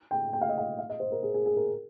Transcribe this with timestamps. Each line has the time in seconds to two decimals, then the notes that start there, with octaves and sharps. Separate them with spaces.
0.11 G5
0.33 G5
0.41 F5
0.49 D#5
0.58 F5
0.79 F5
0.90 D#5
1.00 C5
1.12 A#4
1.23 G#4
1.34 G#4
1.46 G#4
1.57 A#4